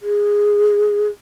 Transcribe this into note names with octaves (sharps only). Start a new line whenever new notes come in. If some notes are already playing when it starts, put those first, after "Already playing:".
G#4